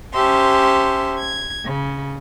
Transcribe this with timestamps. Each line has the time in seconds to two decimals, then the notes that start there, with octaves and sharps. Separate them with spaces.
0.14 C#4 G4 C5 E5 A5 C6
1.18 G#6
1.66 C#3